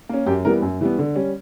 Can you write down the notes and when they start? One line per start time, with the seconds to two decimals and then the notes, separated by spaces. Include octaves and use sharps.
0.09 A#3 C#4
0.26 F#2 G4
0.45 E3 G3 B3 A#4
0.62 F#2
0.81 E3 G3 B3
0.98 D3
1.15 G3 C#4